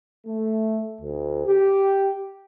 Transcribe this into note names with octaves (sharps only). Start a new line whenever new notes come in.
A3
D2
G4